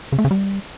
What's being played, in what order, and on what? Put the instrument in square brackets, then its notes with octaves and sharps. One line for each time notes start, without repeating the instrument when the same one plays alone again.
[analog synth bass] C#3
A3
C#3
G3